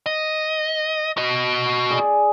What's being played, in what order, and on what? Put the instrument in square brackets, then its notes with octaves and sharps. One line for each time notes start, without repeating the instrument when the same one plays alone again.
[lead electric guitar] D#5
F#4 D#5
[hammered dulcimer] G#4 D5 G#5